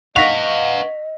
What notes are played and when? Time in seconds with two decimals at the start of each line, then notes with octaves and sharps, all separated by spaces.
0.16 B4 D#5 F5 F#5 C#6 A#6 B6 F7